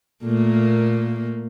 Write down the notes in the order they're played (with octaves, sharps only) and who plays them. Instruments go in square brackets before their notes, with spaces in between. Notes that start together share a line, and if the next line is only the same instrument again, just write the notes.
[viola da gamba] A#2 A3 A#3